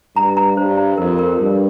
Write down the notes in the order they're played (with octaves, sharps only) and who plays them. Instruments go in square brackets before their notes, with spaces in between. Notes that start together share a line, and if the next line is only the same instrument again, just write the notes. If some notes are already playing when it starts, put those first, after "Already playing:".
[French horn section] G2 [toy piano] A#5
[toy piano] A#5
[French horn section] G2 [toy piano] C5
[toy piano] A#5
[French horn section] F2 [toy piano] A#4
[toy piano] A#4
[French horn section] G2 [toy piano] A#4